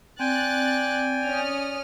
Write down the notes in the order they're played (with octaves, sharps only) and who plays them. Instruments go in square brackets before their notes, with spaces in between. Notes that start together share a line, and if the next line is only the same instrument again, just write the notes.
[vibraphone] C4 [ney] D5 [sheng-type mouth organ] G5 G#5 [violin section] F#6 A6
[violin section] C#4 D#6 F6